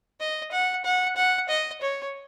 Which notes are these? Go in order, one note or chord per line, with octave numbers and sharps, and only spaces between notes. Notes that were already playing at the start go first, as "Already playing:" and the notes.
D#5
F#5
F#5
F#5
D#5
C#5